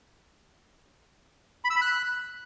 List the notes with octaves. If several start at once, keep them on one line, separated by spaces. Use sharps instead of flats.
B5
E6
B5
F#6